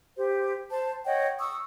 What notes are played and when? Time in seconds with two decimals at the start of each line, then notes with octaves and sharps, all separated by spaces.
0.17 G4 C5
0.71 C5 A5
1.05 C#5 D#5 F#5 G5
1.39 C#6 D#6 E6